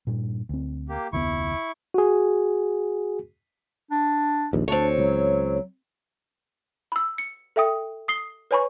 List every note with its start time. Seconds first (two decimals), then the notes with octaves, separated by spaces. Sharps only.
0.07 G2 A#2
0.49 D2 C4
0.89 A#3 G4
1.13 F1 D2 B3 E4 C#6
1.94 F#4 G#4
3.91 D4
4.53 A#1 D#2
4.68 D2 C4 D4 C#5
4.99 C#2 F#3
6.92 B5 E6
7.18 C#7
7.56 A4 E5 G5 D#6
8.08 D#6 C7 G7
8.51 B4 C#5 G#5 B5 C#6